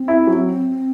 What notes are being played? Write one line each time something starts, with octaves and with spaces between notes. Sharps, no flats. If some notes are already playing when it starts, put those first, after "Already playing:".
Already playing: C4
E4
F#3